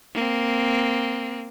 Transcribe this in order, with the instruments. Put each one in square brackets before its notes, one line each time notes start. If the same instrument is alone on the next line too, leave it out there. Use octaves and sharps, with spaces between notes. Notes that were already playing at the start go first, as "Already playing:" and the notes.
[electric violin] A#3 C4